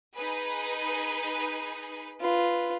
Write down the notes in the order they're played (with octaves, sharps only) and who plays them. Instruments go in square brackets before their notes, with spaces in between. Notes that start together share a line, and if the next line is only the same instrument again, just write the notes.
[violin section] D#4 G#4 B4
[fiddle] F4 B4